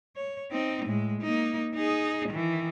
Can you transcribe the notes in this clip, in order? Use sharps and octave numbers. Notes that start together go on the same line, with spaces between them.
C#5
C4 D#4
A2 G#3
A#3 D#4
D#4 G#4
D#3 E3